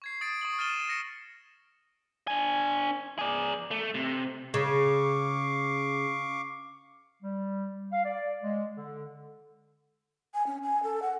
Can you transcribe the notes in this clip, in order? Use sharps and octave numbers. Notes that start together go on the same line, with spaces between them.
C#6 G#6 C7
D#6 A6 D7
C#6 D#6 F#7
F6 A6 D#7 E7 G7
E7
A#6 C#7
D4 G#5
G#4 D5
A3
C3
C#3 F5 C#6 D6
G3
F5
D5
G#3
D3
G#5
C#4
G#5
A4
F#5